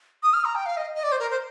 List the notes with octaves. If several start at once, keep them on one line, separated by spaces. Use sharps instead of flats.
D#6
F6
A#5
G5
F5
D#5
D#5
D5
C5
A#4
C5